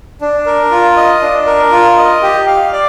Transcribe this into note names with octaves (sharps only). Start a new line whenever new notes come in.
D4
A#4
F4
D#5
D4
A#4
F4
D#5
G4
F5
D5